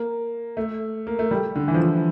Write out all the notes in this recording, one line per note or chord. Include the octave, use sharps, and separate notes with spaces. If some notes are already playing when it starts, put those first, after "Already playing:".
Already playing: A#3
A3
A#3
A3
G3
D3
E3
F3
E3